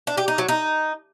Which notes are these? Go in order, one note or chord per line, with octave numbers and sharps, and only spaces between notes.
D4
G4
D#4
F#3
D#4